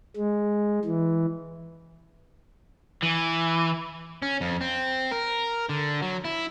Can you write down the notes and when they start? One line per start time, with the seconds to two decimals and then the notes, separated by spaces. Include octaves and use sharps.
0.16 G#3
0.85 E3
3.03 E3
4.22 C#4
4.41 F2
4.61 C4
5.11 A#4
5.69 D3
6.02 F#3
6.25 E4